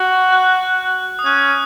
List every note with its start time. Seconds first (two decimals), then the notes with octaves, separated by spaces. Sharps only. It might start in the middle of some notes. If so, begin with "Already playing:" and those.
Already playing: F#4
0.32 F#6
1.19 D#6
1.25 C#4 F#6